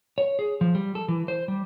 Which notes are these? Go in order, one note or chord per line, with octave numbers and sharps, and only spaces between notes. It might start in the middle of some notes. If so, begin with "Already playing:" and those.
C#5
G#4
F3
G3
A4
E3
C5
G3